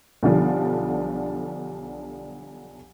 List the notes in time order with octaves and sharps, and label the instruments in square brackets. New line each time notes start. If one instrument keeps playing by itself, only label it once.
[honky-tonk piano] B1 D3 F3 G3